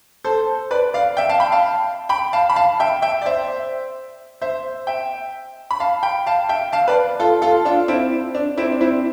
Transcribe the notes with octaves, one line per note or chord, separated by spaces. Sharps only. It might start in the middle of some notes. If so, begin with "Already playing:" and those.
A4 C5
B4 D5
D5 F5
E5 G5
F5 A5
G5 B5
F5 A5
G5 B5
F5 A5
B5
F5 A5
E5 G5
E5 G5
D5
C5 E5
C5 E5
E5 G5
B5
F5 A5
G5 B5
F5 A5
E5 G5
F5 A5
B4 D5
F4 A4
F4 A4
D4 F4
C4 E4
D4
C4 E4
D4
C4 E4